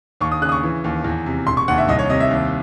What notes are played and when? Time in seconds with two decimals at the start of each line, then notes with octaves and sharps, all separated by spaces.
0.21 D#2 C#6
0.31 D#6
0.42 C#3 F#6
0.49 D#6
0.52 C#6
0.63 E3
0.84 D#2
1.04 E2
1.26 C3
1.47 E1 C6
1.57 C#6
1.68 D#2 F#5
1.78 E5
1.88 C2 D#5
1.99 C#5
2.09 C3 D#5
2.20 E5
2.30 D#2